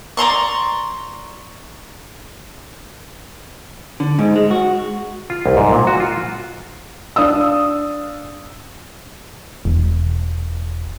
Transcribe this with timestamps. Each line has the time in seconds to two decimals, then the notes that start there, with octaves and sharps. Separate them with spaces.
0.17 D5 A#5 C6 C#6
4.00 D3
4.19 G#2
4.36 G#3
4.51 F#4
5.30 F4
5.46 C2
5.57 G#2
5.72 A#2
5.87 F#4
6.00 F4
7.16 D4 F5 D#6 E6
9.65 E1